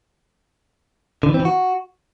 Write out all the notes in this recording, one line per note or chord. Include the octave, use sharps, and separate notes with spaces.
D3
E3
C4
E3
F#4